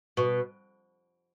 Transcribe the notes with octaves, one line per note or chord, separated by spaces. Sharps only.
B2